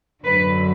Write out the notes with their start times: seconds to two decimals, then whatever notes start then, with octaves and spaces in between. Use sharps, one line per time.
0.24 F#2 D3 F#3 B4